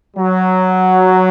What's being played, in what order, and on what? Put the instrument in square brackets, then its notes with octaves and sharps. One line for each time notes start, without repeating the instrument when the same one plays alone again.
[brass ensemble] F#3